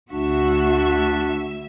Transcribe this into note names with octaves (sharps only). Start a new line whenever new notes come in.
D2 D4 F#4 E5